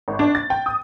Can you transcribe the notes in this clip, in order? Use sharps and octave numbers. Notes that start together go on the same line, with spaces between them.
G#1
D4
A6
G5
D#6